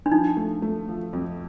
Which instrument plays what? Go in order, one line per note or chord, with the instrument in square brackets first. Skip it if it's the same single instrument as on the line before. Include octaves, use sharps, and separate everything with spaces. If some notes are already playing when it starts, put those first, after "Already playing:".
[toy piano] D4
[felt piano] F3 [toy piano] D#4
[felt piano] A3
A3
F3
F2